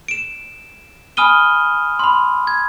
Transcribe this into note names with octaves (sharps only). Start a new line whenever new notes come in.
D7 E7
G#5 B5 D#6 F6 D#7 G7
B5 C6
G#6